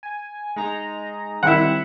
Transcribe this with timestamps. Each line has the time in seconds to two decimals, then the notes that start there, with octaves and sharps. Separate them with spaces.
0.03 G#5
0.56 G#3 D#4 A#5
1.43 D#3 G3 C4 E4 F#5